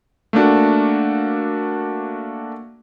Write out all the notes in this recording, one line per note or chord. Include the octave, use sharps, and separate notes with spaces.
A3 A#3 D4 F#4